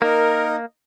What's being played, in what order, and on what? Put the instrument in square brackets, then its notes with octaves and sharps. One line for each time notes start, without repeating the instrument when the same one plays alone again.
[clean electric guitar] A#3 [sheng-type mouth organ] D#4 [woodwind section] A#4